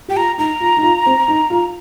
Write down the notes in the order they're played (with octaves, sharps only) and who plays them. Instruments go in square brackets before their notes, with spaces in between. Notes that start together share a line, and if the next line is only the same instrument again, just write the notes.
[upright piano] G4 [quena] G5
[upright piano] F4 [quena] A#5
[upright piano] D#4 [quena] A#5
[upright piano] F4
D#4
F4
C4
D#4
F4